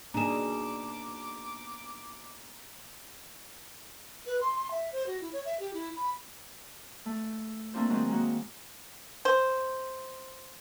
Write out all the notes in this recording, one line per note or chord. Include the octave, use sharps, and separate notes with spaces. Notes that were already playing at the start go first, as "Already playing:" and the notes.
B2 A#3 D4 D#4 G#4 A#5 D6 E7
B4
C6
C6
E5
C5
F#4
E4
C#5
E5
G4
E4
B5
A3
A3 A#3 C4 D4 F4 C5
D#3 F#3 G#3 C4
G#3 A#3 F#4
C5